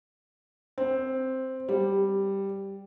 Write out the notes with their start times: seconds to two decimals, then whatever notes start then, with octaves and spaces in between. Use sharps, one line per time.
0.78 C4
1.68 G3